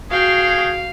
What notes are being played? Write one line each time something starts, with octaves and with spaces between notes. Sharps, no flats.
F#4 G#4 F5 G5